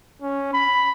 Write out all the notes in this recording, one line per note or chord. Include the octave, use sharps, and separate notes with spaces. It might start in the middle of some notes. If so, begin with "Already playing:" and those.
C#4
B5